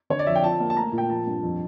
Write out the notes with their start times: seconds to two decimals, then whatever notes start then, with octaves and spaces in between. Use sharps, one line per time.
0.10 D3 C#5
0.19 D5
0.27 F2 E5
0.35 G5
0.44 F3 A5
0.60 A#3
0.70 A5
0.76 A3 A#5
0.92 A#2
0.98 G5
1.10 F3 A5
1.27 G2
1.43 F2